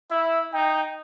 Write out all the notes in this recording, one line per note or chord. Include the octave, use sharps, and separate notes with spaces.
E4 E5
D#4 G5